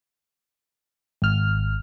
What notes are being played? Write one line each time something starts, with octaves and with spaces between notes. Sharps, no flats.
G#1 F6